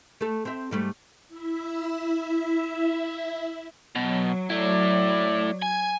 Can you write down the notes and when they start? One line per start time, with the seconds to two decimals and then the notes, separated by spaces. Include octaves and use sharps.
0.21 A3 A4
0.45 C4 E5
0.71 G#2 G3 A3
1.28 E4 E5
3.96 B2 F#3
4.50 A3 E4 D5
5.62 G#5 G#6